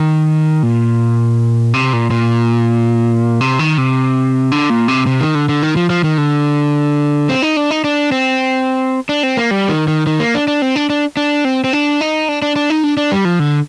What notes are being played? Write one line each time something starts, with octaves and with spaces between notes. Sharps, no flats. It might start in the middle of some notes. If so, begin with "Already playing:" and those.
Already playing: D#3
A#2
C3
A#2
A#2
C3
D#3
C3
D3
A#2
C3
C3
D#3
D3
D3
D#3
F3
F3
D#3
D3
C4
D#4
D4
D#4
D4
C4
D4
C4
A#3
G3
D#3
D#3
D#3
A#3
D4
D4
C4
D4
D4
D4
C4
C4
D4
D#4
D4
D4
D4
D#4
D4
D4
G3
F3
D3